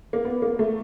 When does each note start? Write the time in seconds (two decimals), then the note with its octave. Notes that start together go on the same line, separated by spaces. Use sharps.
0.13 A#3
0.25 B3
0.42 A#3
0.59 A3